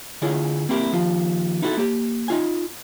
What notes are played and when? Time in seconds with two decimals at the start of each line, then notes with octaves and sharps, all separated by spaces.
0.22 D3 E4 F4 G#4 C#5
0.69 A#3 C4 E4 G4 A#4
0.92 D#2 F3 F4
1.62 D#4 E4 F#4 G4 A4
1.77 A#3 G4
2.28 D#4 F4 G#5